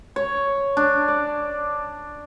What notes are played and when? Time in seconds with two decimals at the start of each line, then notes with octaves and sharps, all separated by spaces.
0.16 C#5
0.77 D4
1.08 D5